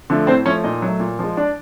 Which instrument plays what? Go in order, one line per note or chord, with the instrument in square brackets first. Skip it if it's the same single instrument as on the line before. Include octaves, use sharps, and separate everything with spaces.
[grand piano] D3 F3 A3
A2 C4 C5
F3 A3 C#4 C#5
A#2 D#4 D#5
F#3 A3
A#2
F3 G#3
D4 D5